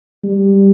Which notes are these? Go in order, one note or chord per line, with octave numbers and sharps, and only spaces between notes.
G3